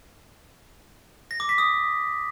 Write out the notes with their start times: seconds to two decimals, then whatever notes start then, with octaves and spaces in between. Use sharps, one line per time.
1.31 A#6
1.40 D6
1.49 B6
1.58 D#6